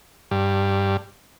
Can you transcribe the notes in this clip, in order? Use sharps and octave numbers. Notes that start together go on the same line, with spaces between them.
G2